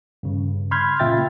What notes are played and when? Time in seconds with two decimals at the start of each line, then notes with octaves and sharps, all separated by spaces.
0.23 G2 C#3
0.71 B5 C6 F6 G6 G#6
0.99 A#2 C#3 F4 E5 G5 A6